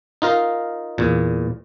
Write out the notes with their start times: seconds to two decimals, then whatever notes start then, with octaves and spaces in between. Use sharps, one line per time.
0.22 D#4 F4 A#4 D#5 F5
0.98 E2 A#2